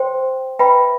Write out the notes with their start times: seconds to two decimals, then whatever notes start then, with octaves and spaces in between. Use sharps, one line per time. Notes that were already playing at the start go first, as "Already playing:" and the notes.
Already playing: C5 G5 C6
0.59 B4 E5 G5 B5